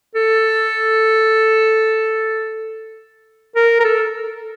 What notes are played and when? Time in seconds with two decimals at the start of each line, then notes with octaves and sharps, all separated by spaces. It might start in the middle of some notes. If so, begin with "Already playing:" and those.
0.15 A4
3.56 A#4
3.81 A#4
3.85 A4